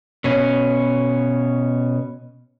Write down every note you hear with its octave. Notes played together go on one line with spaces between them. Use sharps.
B2 C#4